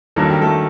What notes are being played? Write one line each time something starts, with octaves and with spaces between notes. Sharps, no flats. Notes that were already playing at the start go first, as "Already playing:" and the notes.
G2 D#3 F#3 A#3 A4
G4
A3 A4